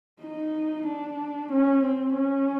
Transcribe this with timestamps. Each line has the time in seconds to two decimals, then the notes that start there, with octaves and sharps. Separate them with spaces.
0.22 D#4
0.87 D4
1.52 C#4
1.84 C4
2.16 C#4